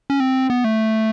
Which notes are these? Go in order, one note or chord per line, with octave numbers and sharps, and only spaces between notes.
C#4
C4
B3
A3